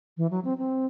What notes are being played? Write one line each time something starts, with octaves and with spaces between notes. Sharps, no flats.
E3
F#3
C4
C4